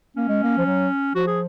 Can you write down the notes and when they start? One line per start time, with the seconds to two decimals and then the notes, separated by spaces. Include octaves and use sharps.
0.16 A#3 C#4
0.28 G#3
0.43 A#3
0.58 F3
0.66 F#3
1.15 F3 F#4
1.27 G#4